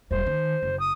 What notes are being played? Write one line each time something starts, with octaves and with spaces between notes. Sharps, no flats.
E1 G3 C5
D#3
F#1
D#6